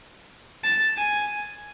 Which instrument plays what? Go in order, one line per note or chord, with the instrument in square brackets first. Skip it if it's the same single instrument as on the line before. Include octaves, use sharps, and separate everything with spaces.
[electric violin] A5
G#5